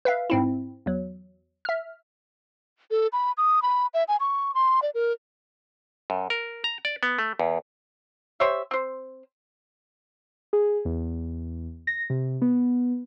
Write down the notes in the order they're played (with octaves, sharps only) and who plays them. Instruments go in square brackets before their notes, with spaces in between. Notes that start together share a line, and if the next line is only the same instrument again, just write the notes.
[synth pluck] B4 E5 F5
G#2 C4 E4
E2 F#3
E5 F6
[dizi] A4
B5
D#6
B5
E5
G#5
C#6
C6
D5
A#4
[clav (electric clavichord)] F#2
A#4
A#5
D5
B3
A3
E2
[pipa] G4 C5 C#5 E5
C4 C5
[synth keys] G#4
E2
A#6
C3
B3